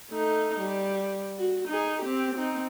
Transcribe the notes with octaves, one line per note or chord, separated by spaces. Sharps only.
A3 D#4
G3
F#4
D#4 G#4
C4 G4
C4 D#4